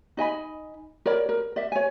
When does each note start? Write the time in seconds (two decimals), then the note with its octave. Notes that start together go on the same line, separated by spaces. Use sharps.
0.17 D#4 D#5 G#5 B5
1.06 A#4 C#5 D5 B5
1.29 A#4
1.56 D5 E5
1.72 C#5 G#5